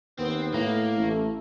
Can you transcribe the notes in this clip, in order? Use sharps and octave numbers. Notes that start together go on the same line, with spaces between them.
D#2 B3 C4
A2 A#3
A1 A3